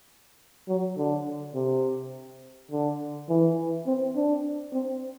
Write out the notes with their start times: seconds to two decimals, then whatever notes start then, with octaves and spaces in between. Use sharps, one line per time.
0.69 F#3
0.98 D3
1.55 C3
2.71 D3
3.29 E3
3.87 C4
4.16 D4
4.73 C4